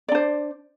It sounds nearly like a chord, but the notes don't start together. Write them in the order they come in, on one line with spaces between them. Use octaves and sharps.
D5 D4 C5